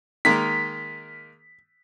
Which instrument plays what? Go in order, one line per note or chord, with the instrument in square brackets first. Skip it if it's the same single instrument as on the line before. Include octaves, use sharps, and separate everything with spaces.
[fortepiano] D#3 G#3 A#3 [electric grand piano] B6